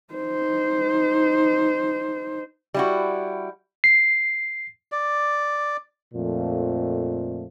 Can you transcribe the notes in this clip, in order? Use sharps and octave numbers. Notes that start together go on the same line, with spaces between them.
D#4 C5
G3 E4 F#4
C7
D5
F2 A#2 F3 A3